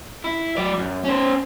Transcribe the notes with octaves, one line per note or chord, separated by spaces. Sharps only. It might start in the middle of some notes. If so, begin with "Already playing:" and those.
E4
F#3 D5
F#2
C#4 C5